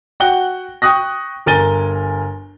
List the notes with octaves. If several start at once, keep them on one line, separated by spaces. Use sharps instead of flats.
F#4 F#5 G5 F#6 G7
G5 C#6 D#6 F#6 A#6
G1 A#4 G#5 A6 D#7 G7